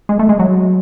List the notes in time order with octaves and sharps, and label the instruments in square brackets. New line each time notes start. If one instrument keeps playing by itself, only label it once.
[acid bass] G#3
A3
G#3
F#3